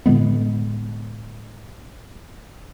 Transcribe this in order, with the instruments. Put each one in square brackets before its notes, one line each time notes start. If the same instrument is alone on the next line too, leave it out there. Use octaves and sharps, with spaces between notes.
[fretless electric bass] A2 D3 G#3 B3